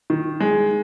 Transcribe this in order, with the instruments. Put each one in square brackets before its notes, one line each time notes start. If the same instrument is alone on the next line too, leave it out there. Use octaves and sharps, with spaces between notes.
[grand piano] D#3
G#3